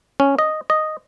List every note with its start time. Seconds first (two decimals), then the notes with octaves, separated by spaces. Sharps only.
0.20 C#4
0.39 D#5
0.70 D#5